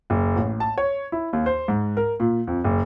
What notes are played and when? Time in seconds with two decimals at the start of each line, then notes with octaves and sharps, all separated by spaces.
0.10 F#1
0.36 A1
0.60 A5
0.78 C#5
1.12 E4
1.33 D#2
1.46 C5
1.68 G#2
1.97 A#4
2.20 A#2
2.47 F2
2.64 F#1